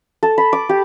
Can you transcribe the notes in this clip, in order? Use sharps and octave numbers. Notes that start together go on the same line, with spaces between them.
A4
B5
D6
G4